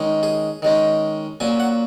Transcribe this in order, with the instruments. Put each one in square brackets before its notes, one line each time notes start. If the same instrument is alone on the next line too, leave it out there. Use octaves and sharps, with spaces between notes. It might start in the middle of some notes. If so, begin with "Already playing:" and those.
Already playing: [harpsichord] D#3 G#3 C#4
G#4
D#3 G#3 C#4
A#2 F#3 C#4 G#5
F#5